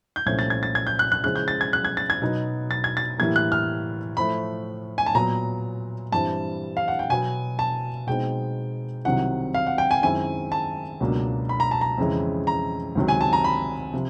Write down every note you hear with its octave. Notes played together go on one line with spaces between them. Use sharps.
G6
C2 A#2 F3 A3 C#4 G#6
A6
G#6
A6
G#6
G6
F#6
F#6
C#3 F3 G#3 C#4 E4 F#6
G6
A6
G#6
F#6
G#6
A6
G#6
B2 F#3 B3 D#4
A6
G#6
A6
A2 E3 G3 A#3 G#6
F#6
F6
A2 F3 A3 B5
G#5
A5
A#2 F#3 B3 A#5
G2 E3 G3 C4 A5
F5
F#5
G5
B2 F#3 B3 G#5
A5
B2 G#3 C4 D#4 G5
C2 C3 D#3 F#3 F#5
F5
F#5
G5
G#5
F#2 D#3 G#3 C4 E4 G#5
A5
C#2 B2 F#3 A#3 D4
B5
A#5
A5
A#5
F2 C#3 E3 G#3 C#4
A#5
C#2 C3 D#3 F#3
G#5
A5
A#5
B5
C3 F3